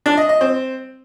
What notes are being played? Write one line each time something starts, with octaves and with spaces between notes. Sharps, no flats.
D4
D#5
D#5
C4